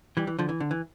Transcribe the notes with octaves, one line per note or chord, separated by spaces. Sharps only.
E3 G3
E3
D3 F3
E3
D3
E3